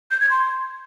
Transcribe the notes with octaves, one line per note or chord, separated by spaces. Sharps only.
G6
G#6
C6